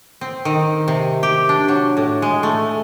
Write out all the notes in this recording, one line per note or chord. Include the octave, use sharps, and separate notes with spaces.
C4
D#3
C3
G4
D4
F#3
A2
G#3
A3